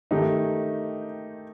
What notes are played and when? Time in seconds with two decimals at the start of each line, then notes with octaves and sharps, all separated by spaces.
0.11 D#3 A3 D#4 G4